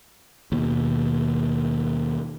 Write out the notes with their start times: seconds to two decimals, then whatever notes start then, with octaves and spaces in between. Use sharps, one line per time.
0.52 D#2 B2